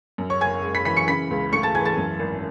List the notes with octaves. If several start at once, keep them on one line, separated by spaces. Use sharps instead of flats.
F#2
C#5 C#6
F#1 G#5 G#6
G#3
B5 B6
E3 B5 B6
C#6 C#7
C#3 B5 B6
C#2
A3 C#6 C#7
A5 A6
E3 G#5 G#6
A5 A6
F#2
G#1